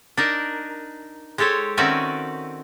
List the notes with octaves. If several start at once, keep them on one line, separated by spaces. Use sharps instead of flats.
D4 D#4 A#4
G#3 G4 A4 C5 C#5
D#3 C4 C#4 F#4 D5 E5